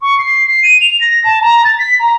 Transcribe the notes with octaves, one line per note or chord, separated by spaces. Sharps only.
C#6
C7
C7
D#7
F7
A#6
A5
A#5
A6
B6
A#5